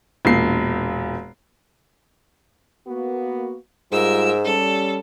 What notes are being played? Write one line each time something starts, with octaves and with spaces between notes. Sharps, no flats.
E1 A#2 C7
A#3 B3 F#4
G#2 G3 F4 A#4 E6
G3 C#4 A4